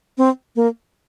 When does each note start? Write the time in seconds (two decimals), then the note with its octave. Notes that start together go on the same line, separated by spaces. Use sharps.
0.18 C4
0.56 A#3